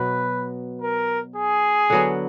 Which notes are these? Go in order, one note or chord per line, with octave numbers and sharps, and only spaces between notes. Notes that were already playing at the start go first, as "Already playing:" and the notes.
Already playing: B2 F#3 B3 B4
A#4
G#4
D3 F#3 B3